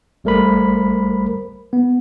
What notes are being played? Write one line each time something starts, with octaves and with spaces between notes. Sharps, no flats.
A1 G3 A3 A#4 C5 B5
B3